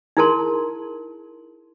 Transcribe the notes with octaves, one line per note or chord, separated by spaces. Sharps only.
D#4 E4 G#4 A#4 A5 C6